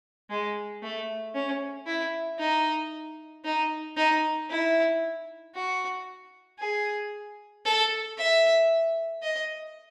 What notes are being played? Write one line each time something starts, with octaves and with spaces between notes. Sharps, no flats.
G#3
A3
C#4
E4
D#4
D#4
D#4
E4
F#4
G#4
A4
E5
D#5